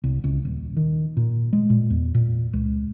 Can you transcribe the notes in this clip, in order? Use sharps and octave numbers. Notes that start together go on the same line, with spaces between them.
C2
C#2
D#1
D#3
A#2
G#3
A#2
E2
A#2
C#2